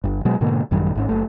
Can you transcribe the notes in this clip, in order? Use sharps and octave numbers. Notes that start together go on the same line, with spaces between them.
G1 G2
B2 F#3 G#3
G#2 B2 D3 A#3
A1 F#2 D#3 G3
G#1 G#2 C#4
F#1 A3